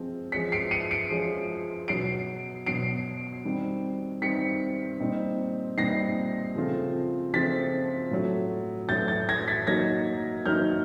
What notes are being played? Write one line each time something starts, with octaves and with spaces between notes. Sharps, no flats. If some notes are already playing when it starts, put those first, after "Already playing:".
Already playing: F3 G#3 C4
F3 G#3 C#4 B6 C#7
C7 D7
C#7 D#7
C7 D7
F3 G#3 C#4
B2 F#3 B3 C7 D7
B2 F#3 B3 C7 D7
D#3 G3 C4
D#3 G3 C4 B6 C#7
A#2 G3 C4 D#4
A#2 G3 C4 D#4 A#6 C7
C#3 F3 A3 C4 F4
C#3 F3 A3 C4 F4 A6 B6
A2 F#3 A3
A2 F#3 A3 G6 A6
G6 A6
G#6 A#6
A6 B6
D#3 F#3 A#3 D#4 G#6 A#6
D#3 F#3 A#3 D#4 F6 G6